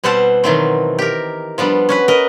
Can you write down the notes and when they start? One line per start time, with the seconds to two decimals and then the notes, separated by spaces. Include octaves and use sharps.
0.04 B2 G3 C4 C5 F#5 A5
0.44 B2 D#3 E3 F#3 C4
0.99 G4 A#4
1.58 F3 G3 B3 D4
1.89 C#4 F#4 B4
2.08 A#4 B4 D#5